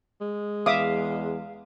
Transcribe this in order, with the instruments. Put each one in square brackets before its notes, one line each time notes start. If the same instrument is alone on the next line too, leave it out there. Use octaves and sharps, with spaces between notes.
[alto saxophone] G#3
[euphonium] E2 [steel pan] E5 D6 D#6 [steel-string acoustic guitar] F5